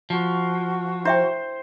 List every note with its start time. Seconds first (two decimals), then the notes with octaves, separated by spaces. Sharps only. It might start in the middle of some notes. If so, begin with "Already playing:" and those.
0.10 F3 F#4
1.05 E4 C5 E5 G5